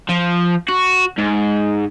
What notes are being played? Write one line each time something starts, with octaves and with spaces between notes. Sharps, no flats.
F3
F#4
G#2